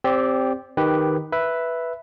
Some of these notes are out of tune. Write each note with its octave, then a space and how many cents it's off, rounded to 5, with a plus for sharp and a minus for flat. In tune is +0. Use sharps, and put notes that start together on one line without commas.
C4 +0 G4 +0 D5 -25
D#3 -5 G4 +0 B4 +0
B4 +0 E5 +0